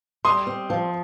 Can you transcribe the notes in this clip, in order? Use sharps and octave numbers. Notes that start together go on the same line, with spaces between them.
G3 C6 D#6
C4
F3